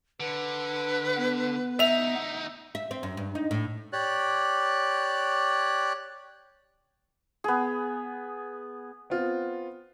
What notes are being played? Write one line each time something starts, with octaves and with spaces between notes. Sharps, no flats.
D3 B4
B3
D2 D#4 E5 F7
E5
C4
F#2
G2
D#4
A2
G4 C#5 D5 F#6
B3 G#4
B3 C4 F4